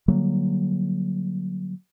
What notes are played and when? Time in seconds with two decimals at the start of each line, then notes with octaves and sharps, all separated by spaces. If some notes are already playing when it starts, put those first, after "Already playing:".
0.08 D3 F#3 G3 A#3